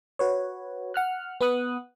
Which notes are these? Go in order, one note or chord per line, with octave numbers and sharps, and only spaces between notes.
F#4 B4 C#5
F#5 F6 F#6
B3 B4 F#5 D#6 F#6